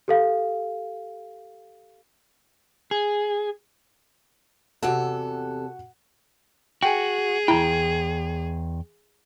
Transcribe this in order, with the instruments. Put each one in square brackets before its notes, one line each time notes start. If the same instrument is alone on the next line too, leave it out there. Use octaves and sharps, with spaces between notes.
[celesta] G4 A4 F5
[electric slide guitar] G#4
[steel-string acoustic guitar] E2 C3 A4 [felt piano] F#4 F#5
[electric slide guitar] F#4 [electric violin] G#4 [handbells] G5 G#5
[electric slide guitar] E2 G#2 G5 [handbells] E4 A#5